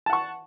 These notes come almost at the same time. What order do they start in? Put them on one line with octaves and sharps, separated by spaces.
A5 F#5 C#6